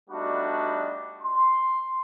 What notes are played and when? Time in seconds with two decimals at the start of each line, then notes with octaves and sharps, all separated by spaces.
0.10 G3 A3 B3 D4 D#4 F#4
1.22 C6